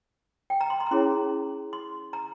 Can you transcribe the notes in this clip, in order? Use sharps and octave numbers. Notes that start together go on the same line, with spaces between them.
G5
A#5
C6
C6
A#5
C#4 E4 G#4 C#5 C6
C6
A#5